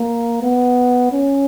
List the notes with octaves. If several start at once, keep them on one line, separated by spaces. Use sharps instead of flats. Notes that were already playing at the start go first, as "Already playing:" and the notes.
Already playing: A#3
B3
C#4